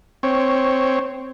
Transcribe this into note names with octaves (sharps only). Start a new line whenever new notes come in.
C4 C#5